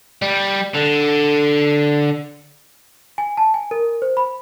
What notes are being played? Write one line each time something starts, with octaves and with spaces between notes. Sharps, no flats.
G3
D3
G#5
A5
G#5
A#4
C5
B5